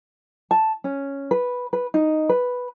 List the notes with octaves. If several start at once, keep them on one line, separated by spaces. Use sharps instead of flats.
A5
C#4
B4
B4
D#4
B4